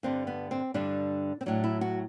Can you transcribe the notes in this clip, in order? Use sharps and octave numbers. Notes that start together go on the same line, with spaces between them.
G2 D3 G3 C4
B3
C4
G2 D3 G3 D4
C4
A2 F#3 D4
E4
F#4